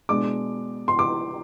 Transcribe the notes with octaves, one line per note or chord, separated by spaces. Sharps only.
B2 G#3 D4 D6
C6
D6